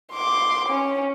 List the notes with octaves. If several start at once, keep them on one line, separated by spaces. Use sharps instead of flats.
C6 D6
C#4